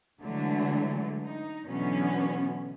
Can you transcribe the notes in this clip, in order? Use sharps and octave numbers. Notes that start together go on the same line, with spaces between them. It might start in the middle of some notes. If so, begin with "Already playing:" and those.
D3 E3 F#3 G#3 A3 D4
D#4
B2 D3 E3 F#3 B3 C#4